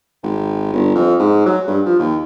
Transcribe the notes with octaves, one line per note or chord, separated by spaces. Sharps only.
G#1
G1
F2
G#2
F#3
G2
F3
D#2